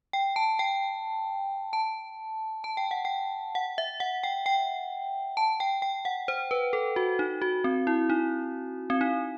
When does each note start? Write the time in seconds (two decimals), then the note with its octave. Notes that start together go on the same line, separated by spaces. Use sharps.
0.13 G5
0.36 A5
0.59 G5
1.73 A5
2.64 A5
2.77 G5
2.91 F#5
3.05 G5
3.55 F#5
3.78 E5
4.00 F#5
4.23 G5
4.46 G5
5.37 A5
5.60 G5
5.82 G5
6.05 F#5
6.28 C5
6.51 B4
6.73 A4
6.96 F#4
7.19 D#4
7.42 F#4
7.64 C4
7.87 E4
8.10 D#4
8.90 C4
9.01 D#4